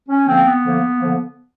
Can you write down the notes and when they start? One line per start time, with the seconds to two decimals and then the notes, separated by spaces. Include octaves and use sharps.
0.09 C#4
0.27 D3 F3 A#3 C4
0.45 B3
0.63 D3 F3 A#3
0.98 D3 F3 A#3